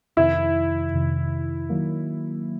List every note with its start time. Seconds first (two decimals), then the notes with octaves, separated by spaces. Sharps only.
0.17 F2 C3 D#3 E4
0.93 F2 C3 D#3
1.69 D#3 F#3 A#3